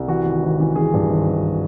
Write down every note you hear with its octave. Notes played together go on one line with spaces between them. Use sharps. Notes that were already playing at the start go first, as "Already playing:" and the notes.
Already playing: C2
E3 F#4
G#1
G#1
E3
E3 G#4
G2
G#1
G#1